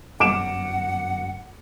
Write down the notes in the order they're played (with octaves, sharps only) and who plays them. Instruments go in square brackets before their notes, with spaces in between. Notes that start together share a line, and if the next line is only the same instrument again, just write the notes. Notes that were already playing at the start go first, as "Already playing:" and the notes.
[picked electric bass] G1 F#2 [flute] F#5 [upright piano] D6 D7 E7